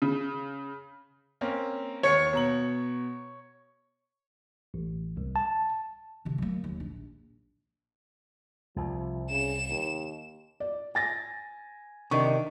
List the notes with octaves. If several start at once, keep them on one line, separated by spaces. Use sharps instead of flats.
C#3
A#3 C4 C#4
D#2 C#5 C#7
B2 A#5 F#7
A1
C2
A5
C3 D#3
F#3 A#3
D#2
A#1
C2 F3
C#3 E7
D#2
D5
G#5 A6 A#6
C3 D#3 D4 C#6